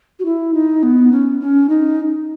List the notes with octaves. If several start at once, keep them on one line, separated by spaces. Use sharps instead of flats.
F#4
E4
D#4
B3
C#4
C#4
D#4